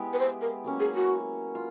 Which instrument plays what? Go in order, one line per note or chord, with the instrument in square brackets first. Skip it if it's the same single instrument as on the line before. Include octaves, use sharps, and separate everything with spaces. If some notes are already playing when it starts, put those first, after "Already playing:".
Already playing: [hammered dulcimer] G#3 B3 E4 G4
[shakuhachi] B4
C5
A#4
[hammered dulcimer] F#3 A#3 C#4
[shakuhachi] G#4
F#4
[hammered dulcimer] F4